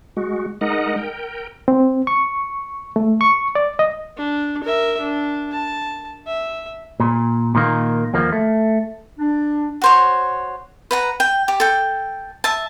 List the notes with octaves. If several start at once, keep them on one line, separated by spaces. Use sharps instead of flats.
G#3 F#4
G#3 D#4 A#4 D#5 F#5
A#4 G5
C4
C#6
A3
C#6
D5
D#5
D4
A#4 E5
D4
A5
E5
A#2
A#2 D#3 A#3
D#2 F3 A#3
A3
D4
F#4 C5 C#5
B4 F#5 A#5
G5
G4
A4 G5
E5 A5